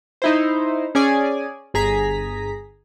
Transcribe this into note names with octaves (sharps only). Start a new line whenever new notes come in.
D#4 E4 C5
C#4 G#4 D5 G#5
G1 G#4 A#5 B6